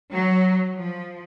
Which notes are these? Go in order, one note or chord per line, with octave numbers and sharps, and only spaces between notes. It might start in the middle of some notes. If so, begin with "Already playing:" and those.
F#3
F3